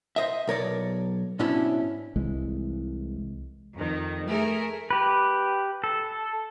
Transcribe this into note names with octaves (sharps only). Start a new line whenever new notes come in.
C5 D#5 E5
B1 A#4 C#5 D5
G#2 B2 C#4 D4 E4
C2 E3 G#3
F2 D#3
A3 G#4 A#4
G4 B4
A4